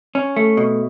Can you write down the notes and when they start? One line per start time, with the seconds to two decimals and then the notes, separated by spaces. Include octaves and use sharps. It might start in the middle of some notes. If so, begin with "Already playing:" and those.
0.15 C#4
0.36 A3
0.57 B2